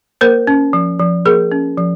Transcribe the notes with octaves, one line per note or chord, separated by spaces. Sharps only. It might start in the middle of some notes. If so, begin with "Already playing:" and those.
A#3 A#4 C5
C#4
F3
F3
A#3 G#4 A#4
C#4
F3